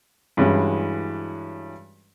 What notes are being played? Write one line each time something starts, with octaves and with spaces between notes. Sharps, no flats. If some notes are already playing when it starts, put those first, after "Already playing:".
G2 E3 G#3 C#4 E4 F#4